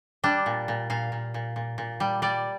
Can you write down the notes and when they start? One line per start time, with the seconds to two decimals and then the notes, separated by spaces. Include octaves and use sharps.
0.23 G3 D4
0.46 A#2
0.68 A#2
0.90 A#2 F5
1.12 A#2
1.34 A#2
1.56 A#2
1.78 A#2
2.00 G3
2.22 G3 D5